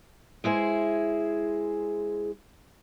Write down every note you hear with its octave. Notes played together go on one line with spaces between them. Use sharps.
G#3 E4 G#4 C5